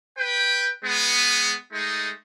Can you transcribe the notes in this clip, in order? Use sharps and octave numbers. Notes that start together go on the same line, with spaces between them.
B4 G5
G#3 B3
G#3 A3 D#4